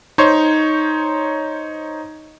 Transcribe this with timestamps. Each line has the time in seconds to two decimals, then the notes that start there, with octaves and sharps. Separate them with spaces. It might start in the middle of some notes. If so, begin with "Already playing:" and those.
0.18 D#4 C5 C#5 C6